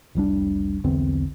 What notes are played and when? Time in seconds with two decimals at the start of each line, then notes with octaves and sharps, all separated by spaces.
0.15 F1 C2 G3 D4
0.84 B1 E2 D3 C4